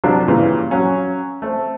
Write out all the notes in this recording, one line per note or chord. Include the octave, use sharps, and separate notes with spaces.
C3 F3 F#3 D4 F4
G2 A#2 C#3 E3
F#3 C#4 F5
A3 C4